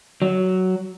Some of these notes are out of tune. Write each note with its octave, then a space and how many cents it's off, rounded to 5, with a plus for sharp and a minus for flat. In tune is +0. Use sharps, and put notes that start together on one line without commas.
F#3 +10